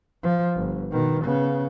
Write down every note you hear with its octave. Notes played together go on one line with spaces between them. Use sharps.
F3
G1
B2 D#3
C#3 B3